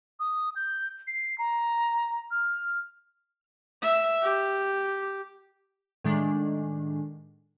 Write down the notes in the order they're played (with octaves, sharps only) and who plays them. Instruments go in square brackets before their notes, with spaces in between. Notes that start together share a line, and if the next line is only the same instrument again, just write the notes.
[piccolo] D#6
G6
C7
A#5
F6
[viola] E5
G4
[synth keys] A2 D#3 G#3 D4